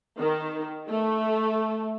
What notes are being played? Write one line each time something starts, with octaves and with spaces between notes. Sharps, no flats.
D#3
A3